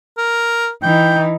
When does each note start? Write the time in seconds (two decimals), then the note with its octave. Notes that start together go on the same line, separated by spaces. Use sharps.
0.18 A#4
0.83 E3 D#4 G5